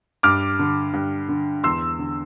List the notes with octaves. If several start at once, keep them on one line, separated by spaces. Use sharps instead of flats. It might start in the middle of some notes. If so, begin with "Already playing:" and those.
G2 D6 F6
D3
G2
D3
E2 C6 E6
D3